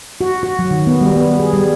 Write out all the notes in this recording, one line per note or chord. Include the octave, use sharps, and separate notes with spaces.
F#4
F#4
F#3
D#3
B3
G3
B3
G#4
G3